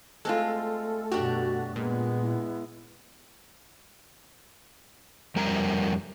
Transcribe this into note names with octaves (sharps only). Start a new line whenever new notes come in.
G#3 A3 C4 F4 A4
F#2 B2 D4 F#4 G4
A#2 G#3 B3
E4
F2 G3 A#4 A#5